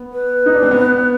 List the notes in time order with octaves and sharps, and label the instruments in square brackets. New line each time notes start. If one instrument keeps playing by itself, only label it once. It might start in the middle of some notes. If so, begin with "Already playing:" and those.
Already playing: [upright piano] B3
[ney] B4
[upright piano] D#4
D4
C4
B3